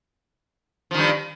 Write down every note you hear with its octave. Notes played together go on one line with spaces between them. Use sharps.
G2 D#3 F3